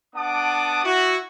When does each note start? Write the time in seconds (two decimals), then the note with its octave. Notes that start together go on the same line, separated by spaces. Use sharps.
0.15 B3 D4 F#5 A5 D6 D#6
0.84 E4 F#4